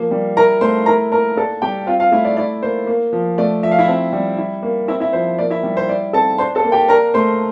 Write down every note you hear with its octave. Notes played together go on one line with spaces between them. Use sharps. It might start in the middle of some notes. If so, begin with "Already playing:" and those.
Already playing: F3 A#3
G3
E4 A#4 A#5
A3 C5 C6
E4 A#4 A#5
A#3 A#4 A#5
D4 A4 A5
G3 G4 G5
C4 F4 F5
F4 F5
A3 E4 E5
D5
E4 D5
A#3 C5
A#3
F3
A3 D5
F3 E5
F5
E4 E5
C4
G3
E4
A#3
C4 E4 E5
E4 E5
F3 C5
A#3 D5
E4 E5
G3
C5
E4 D5
C4 A4 A5
D4 C5 C6
A4 A5
A#3
G4 G5
D4 A#4 A#5
A3 C5 C6